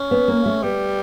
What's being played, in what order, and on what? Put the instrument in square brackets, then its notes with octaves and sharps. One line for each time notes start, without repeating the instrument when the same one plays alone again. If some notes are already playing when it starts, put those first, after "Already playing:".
Already playing: [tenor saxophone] C#4
[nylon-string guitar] B3
A#3
A3
[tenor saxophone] G3 [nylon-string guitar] B3